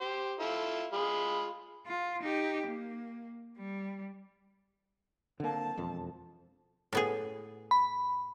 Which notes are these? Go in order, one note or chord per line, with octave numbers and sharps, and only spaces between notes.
G4 C5
E4 F4 A4
G#3 F4 B5
F4
D#4 G4
A#3
G3
D3 A#3 C4 A5
E1 F2
A2 B3 G#4
B5